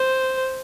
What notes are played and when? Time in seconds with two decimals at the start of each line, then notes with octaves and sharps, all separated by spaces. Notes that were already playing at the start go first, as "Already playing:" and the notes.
Already playing: C5